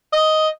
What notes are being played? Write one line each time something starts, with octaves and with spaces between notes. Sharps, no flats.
D#5